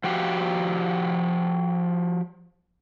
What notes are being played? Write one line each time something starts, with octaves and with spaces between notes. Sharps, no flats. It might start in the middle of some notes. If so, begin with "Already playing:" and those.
F3 F#4 G4 F5